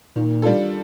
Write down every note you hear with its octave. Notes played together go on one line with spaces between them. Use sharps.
A#2 D#3
G3 D4 F4 A4